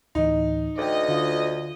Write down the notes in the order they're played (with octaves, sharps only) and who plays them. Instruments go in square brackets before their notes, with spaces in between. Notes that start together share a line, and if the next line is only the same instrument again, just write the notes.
[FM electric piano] D2 A2 E3 [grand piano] D#4
[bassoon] D2 [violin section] D#5 [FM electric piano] G5 D6
[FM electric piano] D3 F4